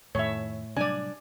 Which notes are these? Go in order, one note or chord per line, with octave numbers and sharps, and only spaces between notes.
F2 A2 D#3 C#5 E5
C3 F#3 G3 D4 D5 G#5